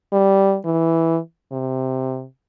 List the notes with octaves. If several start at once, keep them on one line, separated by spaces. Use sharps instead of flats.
G3
E3
C3